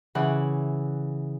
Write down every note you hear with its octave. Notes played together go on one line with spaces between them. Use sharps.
C#3 E3 F#5 D6